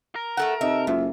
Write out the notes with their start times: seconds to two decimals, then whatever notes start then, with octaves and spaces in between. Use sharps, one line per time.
0.16 A#4
0.37 A3 A4 F#5
0.61 C3 D#4 D#5 E5 A5
0.87 F#1 G#2 F4 E5